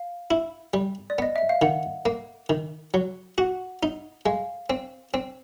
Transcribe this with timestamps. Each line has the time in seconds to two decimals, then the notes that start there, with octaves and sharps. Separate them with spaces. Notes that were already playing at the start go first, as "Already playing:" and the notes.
Already playing: F5
0.31 E4
0.74 G3
1.10 D5
1.18 B3 D#5
1.36 E5
1.49 F5
1.62 D#3 F#5
2.06 A#3
2.50 D#3
2.94 F#3
3.38 F#4 F#5
3.83 D#4
4.26 G#3 F5
4.70 C4
5.14 C4